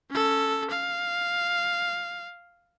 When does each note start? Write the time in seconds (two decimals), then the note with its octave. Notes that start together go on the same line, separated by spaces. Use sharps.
0.10 C#4 A4
0.70 F5